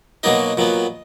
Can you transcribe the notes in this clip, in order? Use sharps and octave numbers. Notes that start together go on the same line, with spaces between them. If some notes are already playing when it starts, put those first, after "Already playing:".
B2 F#3 A#3 D#4 D#5
A#2 F#3 B3